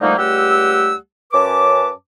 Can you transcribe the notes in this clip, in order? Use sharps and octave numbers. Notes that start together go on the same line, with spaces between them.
D3 F3 G3 A3 A#3 D#4
C#2 G3 A3 G4 F#5 E6
F#2 C#4 B4 A5 D6